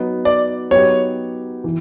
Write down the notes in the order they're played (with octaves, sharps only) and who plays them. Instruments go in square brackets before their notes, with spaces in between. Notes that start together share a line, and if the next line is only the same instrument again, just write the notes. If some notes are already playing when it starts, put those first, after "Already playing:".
Already playing: [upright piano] F#3 B3 D#4
[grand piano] D5
[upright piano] F#3 B3 D#4 G4 [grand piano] C#5
[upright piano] E3